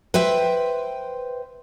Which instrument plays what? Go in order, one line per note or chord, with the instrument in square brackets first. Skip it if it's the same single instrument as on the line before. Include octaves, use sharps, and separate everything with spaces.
[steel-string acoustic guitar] B4 C5 E5 G5